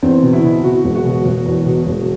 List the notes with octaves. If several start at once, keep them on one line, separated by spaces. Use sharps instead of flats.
E2 C4
B2
E4
B2
B2 F#4
E1
F#4
B2
E1 F#4
E2
B2
E1